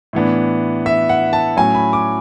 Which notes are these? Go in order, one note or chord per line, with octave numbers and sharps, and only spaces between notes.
A2 E3 B3 D4
E5
F#5
A5
A2 F#3 C#4 G#5
B5
D6